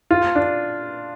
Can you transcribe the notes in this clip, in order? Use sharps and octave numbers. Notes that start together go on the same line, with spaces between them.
F4
D4